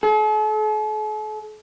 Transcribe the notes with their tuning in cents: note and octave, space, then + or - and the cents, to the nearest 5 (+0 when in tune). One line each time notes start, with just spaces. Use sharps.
A4 -45